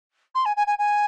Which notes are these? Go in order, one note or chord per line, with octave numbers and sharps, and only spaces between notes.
C6
G#5
G#5
G#5
G#5